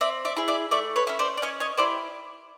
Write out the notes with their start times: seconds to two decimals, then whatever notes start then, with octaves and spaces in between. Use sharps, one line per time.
0.01 C4 D5 E5
0.25 D5 E5
0.36 E4 G#4
0.48 D5 E5
0.71 A3 D5 E5
0.96 B4 C#5
1.07 C#4 E4
1.19 C5 D5
1.37 D5
1.42 C#4 C#5 D#5
1.60 C#5 D#5
1.77 E4 G4 C5 D5